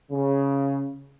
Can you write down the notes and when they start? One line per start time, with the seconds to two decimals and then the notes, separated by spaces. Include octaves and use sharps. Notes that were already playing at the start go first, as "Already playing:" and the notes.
0.11 C#3